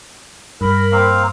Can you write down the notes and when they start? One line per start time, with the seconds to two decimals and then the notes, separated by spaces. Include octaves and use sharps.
0.61 G2 A#4 B5
0.92 A#3 C4 F5